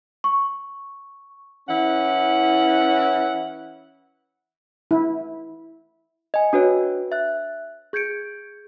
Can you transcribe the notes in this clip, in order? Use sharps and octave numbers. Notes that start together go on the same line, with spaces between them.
C#6
E3 C#4 E4 F#5
E4
D#5 G#5
D4 F#4 B4 C#5
E5 F#6
G#4 G6 G#6 C#7 D7